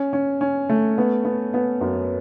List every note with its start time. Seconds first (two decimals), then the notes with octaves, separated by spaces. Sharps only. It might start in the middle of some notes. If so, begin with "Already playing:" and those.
Already playing: C#4
0.13 C#4
0.41 C#4
0.69 A3
0.98 B3
1.25 B3
1.54 B3
1.81 F#2